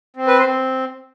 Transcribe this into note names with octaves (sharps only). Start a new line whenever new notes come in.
C4
B4
C5
C4